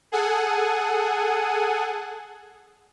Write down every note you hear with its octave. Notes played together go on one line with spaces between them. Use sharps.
G#4 A4 F#5 G#5